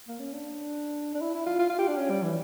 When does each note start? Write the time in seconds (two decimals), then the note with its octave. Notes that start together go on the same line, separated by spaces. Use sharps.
0.08 A#3
0.20 C#4
0.33 D4
1.14 D4
1.21 E4
1.35 E4
1.46 F4
1.59 F4
1.69 F4
1.79 G4
1.88 D4
1.97 C#4
2.10 G3
2.23 E3